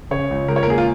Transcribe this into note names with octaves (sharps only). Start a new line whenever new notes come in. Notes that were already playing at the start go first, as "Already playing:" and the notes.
C#3 C#5
C#2
C#2 A#4
C#5
A#4
A#3 G#4
F4